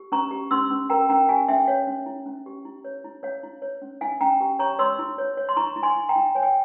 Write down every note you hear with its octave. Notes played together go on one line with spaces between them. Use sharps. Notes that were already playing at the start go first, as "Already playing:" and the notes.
Already playing: G4
C#4 A#5 C#6
G4
C#4 C6 E6
C#4
A#4 G5 A#5
C#4 G5 A#5
G4 F5 G#5
C#4 E5 G5
C#5 F5
C#4
E4
C#4
G4
E4
C#5
E4
C#4 C#5 F5
E4
C#5
C#4
E4 F5 G#5
C#4 G5 A#5
G4
C#5 A#5 C#6
C#5 C6 E6
E4
C#5
C#5
C6
E4 A#5 C#6
E4
G#5 C6
E4
G5 A#5
E4
C#5 G#5
G5